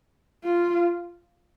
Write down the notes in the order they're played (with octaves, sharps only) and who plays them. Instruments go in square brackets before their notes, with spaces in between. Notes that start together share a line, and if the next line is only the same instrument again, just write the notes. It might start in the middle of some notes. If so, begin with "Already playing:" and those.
[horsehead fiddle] F4